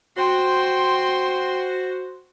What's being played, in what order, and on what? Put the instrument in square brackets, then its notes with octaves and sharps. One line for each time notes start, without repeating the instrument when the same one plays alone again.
[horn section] F#4 C5 [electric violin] G5 C6